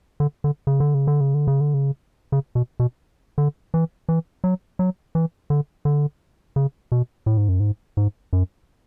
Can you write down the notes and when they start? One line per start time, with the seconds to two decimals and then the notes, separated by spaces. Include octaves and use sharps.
0.20 D3
0.44 D3
0.67 C#3
0.80 D3
0.94 C#3
1.07 D3
1.21 C#3
1.34 D3
1.47 C#3
1.60 D3
1.74 C#3
2.32 C#3
2.55 B2
2.80 B2
3.38 D3
3.74 E3
4.09 E3
4.44 F#3
4.79 F#3
5.15 E3
5.50 D3
5.85 D3
6.56 C#3
6.92 B2
7.26 A2
7.37 G#2
7.49 F#2
7.60 G#2
7.97 G#2
8.33 F#2